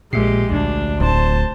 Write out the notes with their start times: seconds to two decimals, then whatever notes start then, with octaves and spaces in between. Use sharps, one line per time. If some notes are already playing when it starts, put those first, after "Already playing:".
0.13 A#1 A#2 G#3 G4 E5 C7
0.51 D2 D4
1.00 D1 C5 A5